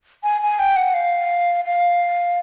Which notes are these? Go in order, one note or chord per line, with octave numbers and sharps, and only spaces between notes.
G#5
G#5
G5
F#5
F5
F5